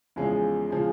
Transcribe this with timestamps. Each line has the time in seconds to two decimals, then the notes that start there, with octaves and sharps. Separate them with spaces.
0.16 E2 C#3 F3 G#3
0.70 C#3 F3 G#3